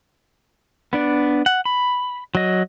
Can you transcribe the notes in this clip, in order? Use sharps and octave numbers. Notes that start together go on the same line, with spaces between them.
B3 D4 D5
F#5
B5
F#3 D#5